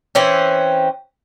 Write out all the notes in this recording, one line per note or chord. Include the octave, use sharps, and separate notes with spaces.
E3 C4 C#4